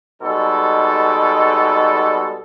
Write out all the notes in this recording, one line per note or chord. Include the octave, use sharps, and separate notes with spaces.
B2 G3 G#3 D#4 A4